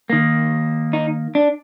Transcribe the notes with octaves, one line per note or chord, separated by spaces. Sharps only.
D#3 A#3
D#4
D4